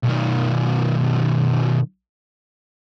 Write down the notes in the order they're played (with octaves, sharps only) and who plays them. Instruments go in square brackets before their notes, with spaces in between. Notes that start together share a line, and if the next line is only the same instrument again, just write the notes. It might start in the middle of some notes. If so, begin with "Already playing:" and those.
[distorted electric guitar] B1 D#3